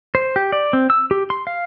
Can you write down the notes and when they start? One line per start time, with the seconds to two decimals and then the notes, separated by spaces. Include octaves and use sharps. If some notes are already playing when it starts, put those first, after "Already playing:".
0.15 C5
0.36 G4
0.52 D5
0.73 C4
0.90 E6
1.11 G4
1.30 C6
1.47 F5